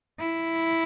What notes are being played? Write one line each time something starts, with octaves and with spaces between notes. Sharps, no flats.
E4